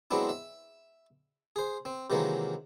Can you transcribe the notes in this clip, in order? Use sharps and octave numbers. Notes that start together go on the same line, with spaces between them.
F#3 G#3 B3 C4 D4 E4
E5
G#4 C5
C4
C3 D#3 E3 F#3 G#3 A#3